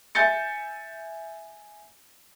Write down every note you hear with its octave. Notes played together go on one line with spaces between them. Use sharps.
E5 G#5 G6 A6 C#7